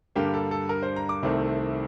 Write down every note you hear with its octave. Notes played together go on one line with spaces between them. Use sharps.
G2 D3 G3 A#3 G4
A4
A4
A#4
C5
A#5
D6
C2 C3 D#3 A3 C4